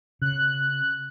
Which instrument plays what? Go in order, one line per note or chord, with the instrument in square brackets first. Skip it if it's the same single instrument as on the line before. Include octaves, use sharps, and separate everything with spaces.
[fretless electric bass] C#3 [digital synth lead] F#6